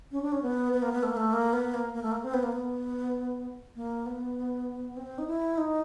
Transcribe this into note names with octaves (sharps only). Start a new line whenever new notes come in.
C#4
D4
C#4
B3
B3
A#3
B3
A3
A#3
A3
A#3
B3
A#3
A#3
A3
A#3
C4
B3
A#3
B3
A#3
B3
C4
D#4
E4
D#4